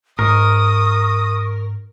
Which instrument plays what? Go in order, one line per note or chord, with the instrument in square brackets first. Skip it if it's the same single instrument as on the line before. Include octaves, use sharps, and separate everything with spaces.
[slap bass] G#2 [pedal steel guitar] A#4 [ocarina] C#6 [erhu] D#6